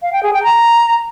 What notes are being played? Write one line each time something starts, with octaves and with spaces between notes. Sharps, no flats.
F5
G5
G#4
G5
A#5